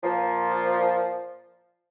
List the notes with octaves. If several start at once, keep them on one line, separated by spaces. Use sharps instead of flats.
A#2 F3